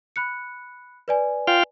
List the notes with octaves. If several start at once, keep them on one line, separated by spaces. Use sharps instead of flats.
B5 F#6 C#7
B4 D5 G#5
F4 F5 G5